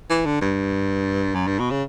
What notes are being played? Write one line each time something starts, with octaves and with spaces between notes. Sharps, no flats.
E3
D3
G2
F#2
G2
B2
C#3